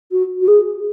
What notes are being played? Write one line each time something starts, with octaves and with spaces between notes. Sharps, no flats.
F#4
F#4
G#4